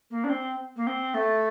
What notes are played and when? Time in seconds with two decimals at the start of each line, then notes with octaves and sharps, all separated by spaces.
0.10 A#3
0.24 D4
0.29 C4
0.76 A#3
0.86 C4
1.14 A3